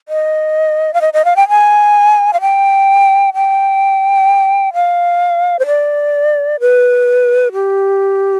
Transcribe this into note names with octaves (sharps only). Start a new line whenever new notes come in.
D#5
F5
D#5
D#5
F5
G5
G#5
F5
G5
G5
F5
C5
D5
B4
G4